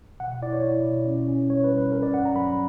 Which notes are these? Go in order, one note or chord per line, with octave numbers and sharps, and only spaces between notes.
B2 F#5
E4 D5
C#5
E4
B2
C#4
C#4
G3 C#5
B4
C#4
B4
C#4 A#4
D5
G2 F#5
A#5
F#3 B5